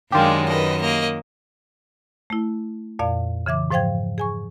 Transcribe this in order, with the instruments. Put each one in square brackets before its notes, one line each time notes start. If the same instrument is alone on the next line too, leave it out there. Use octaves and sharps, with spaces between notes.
[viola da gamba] F#2 D#3 [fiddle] G#3 D4 [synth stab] F4 G4
[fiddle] B4 D#5
A#3 D#5
[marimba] A3 E4
F2 A#2 D5 F5
C#3 E3 E5 D6
G#2 F3 C5 F5 G5 G#6
G#4 G#5 C#6